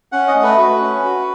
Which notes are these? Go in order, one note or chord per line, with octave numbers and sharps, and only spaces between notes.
C#4 F#5
D#5
A3
B4
F#4
C#4
F#4